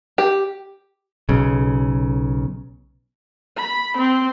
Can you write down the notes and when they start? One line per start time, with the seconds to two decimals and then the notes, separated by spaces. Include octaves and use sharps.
0.18 G4
1.29 B1 C#3
3.59 B5
3.99 C4